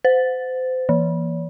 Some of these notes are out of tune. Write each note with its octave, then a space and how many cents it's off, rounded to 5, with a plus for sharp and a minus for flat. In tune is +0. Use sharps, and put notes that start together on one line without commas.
C5 -30
E3 +25